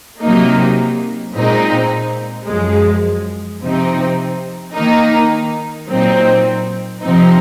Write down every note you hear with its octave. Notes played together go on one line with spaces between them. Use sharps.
C3 F#3 A#3 D#4
A#2 G#3 C4 D#4
F#2 F3 G#3
C3 F3 C4 D#4
D#3 A#3 D#4
A#2 F#3 C4 D#4
C3 F3 C4 D#4